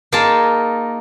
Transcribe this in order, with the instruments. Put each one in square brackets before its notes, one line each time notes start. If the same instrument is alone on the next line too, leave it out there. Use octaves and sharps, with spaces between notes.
[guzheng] A#3 D#4 F4 G#4 A#4 A5